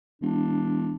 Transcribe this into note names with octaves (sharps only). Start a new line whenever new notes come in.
E1 D4